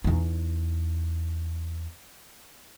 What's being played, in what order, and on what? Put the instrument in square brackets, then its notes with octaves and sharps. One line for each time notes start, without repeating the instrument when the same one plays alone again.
[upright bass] E2 D#4